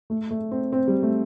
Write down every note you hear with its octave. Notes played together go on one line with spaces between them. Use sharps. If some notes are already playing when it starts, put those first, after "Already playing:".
A3
A3
C4
C4
G3
A3